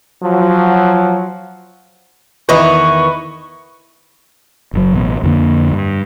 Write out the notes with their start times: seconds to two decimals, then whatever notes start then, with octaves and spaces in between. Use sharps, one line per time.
0.23 F3 F#3
2.49 E2 D#3 E3 B4 D#5 C#6
4.74 F#1 B2 F#3
4.93 A1 B2
5.23 F2 D3 A#3
5.72 G2